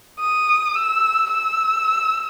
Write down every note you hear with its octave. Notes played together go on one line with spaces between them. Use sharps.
D#6
E6
E6